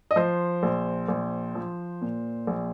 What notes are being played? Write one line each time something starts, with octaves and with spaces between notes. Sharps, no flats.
D#5
F3 C5
A#1
A#1
F3
A#2
A#1